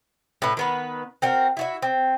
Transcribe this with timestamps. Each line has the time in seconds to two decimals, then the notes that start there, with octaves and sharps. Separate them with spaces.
0.42 A2 B4
0.57 D#3 B3 B4
1.22 C4 F#4 A#4
1.57 E4 F#4 E5
1.82 C4